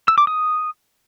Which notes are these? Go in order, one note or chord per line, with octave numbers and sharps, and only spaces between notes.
E6
D6
D#6